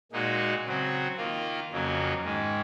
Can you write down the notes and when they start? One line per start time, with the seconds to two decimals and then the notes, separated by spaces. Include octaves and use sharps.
0.12 A#2 G#3 D#4 F#4
0.64 C#3 F#3 C4 F#4
1.17 D#3 A#3 F4
1.71 F2 C#3 F#3 A#3 C#4
2.24 G#2 D#3 G#3